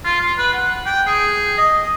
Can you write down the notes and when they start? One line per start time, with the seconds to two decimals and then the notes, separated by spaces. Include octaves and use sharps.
0.04 F4
0.21 F4
0.38 B4
0.53 F#5
0.86 G5
1.07 G#4
1.58 D#5